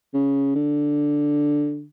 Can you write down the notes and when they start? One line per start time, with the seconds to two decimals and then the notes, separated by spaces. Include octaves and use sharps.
0.14 C#3
0.56 D3